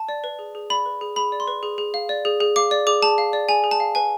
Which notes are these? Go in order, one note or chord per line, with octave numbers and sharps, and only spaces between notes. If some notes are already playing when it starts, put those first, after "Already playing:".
Already playing: A5
D5
B4
G#4
G#4
D5 B5
B4
G#4
G#4 B5
D5
C6
B4
G#4
G#4
F5
D5
G#4
G#4
F5 D6
D5
G#4 D6
G#4 A5
F5
D5
G#4 G#5
G#4
A5
F5
B4 G#5